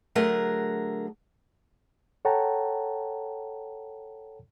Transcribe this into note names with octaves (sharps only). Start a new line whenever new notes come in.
D3 F#3 A3 G#4 A#4 F#5
A4 C#5 F#5 G5 A5 A#5